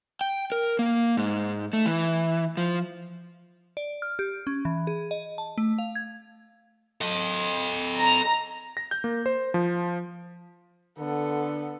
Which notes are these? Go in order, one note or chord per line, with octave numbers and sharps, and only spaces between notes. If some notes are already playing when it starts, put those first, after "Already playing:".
G5
A#4
A#3
G#2
A3
E3
F3
D5
F6
G4
C#4
E3
G#4
D#5
A5
A3
F5
G#6
A4 D#5
A#5
A#6
G6
A#3
C5
F3
D3 B3 A4